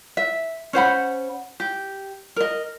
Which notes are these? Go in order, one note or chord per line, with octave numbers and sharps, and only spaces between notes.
E5
C#4 C5 F#5 B5
G4
A#4 D#5